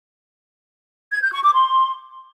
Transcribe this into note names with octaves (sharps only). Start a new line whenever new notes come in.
G#6
G6
C#6
D6
C6